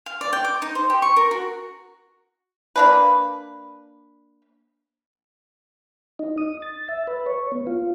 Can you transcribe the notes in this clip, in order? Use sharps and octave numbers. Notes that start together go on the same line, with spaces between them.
F5
D5
G5
D6
D#4
C5
G4
C#6
A#4
F#4
A#3 D4 B4
D#4
D#6
A6
E5
B4
C#5
B3
F4